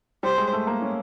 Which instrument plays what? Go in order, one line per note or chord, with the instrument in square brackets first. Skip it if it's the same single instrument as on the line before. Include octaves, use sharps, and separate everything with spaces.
[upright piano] G3 [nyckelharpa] C5
[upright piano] G#3
A3
A#3
C#4